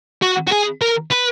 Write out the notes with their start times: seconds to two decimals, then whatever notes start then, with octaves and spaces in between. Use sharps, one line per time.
0.22 F#4
0.48 F#4
0.52 G#4
0.82 A#4
1.11 B4